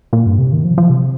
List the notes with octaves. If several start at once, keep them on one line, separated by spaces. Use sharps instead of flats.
A#2
G2
C3
D#3
F3
F3
C3